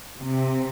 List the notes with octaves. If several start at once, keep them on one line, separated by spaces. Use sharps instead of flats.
C3